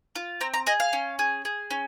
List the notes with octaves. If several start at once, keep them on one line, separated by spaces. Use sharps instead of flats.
F4
C4 A#5
A#5
G#4 D#5
F5
C#4
G#4
G#4
C#4